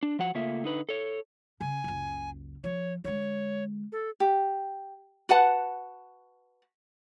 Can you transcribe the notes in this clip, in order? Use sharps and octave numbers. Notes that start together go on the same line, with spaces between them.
D4
F3 F#4 F#5
C#3 A3 A#3 F4 E5
D3 D#4 B4
A4 C#5
C#3 C#4 G#5
F#1 C#2
F3 C#5
D3 G#3 C#5
A4
G4
F#4 B4 F#5 A5